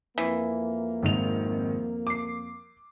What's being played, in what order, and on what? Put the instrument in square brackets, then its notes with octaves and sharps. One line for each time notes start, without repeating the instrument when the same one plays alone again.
[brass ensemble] F2 A#3 [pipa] E3
[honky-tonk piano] G#1 D#3 F7
D6 C7